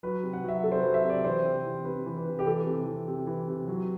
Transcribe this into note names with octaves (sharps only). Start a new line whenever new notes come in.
F#3 B4
C3
F#5
F#3 E5
C3 A4
C5
F#3 B4
E5
C3 D5
E3 C5
C3
E3
C3 B4
E3
B4
C3
G4
E3 A4
C3
E3
C3
E3
C3
F#3